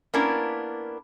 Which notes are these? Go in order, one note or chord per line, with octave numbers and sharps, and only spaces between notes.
A#3 B3 C#4 D4 E4 A#4